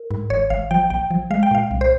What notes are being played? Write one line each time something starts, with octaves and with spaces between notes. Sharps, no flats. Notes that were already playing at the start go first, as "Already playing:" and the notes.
Already playing: A#4
G#2
G#1 C#5
G#1 F5
F3 G5
A#1 G5
F3
G#3 F5
G5
A#2 F5
C2
C5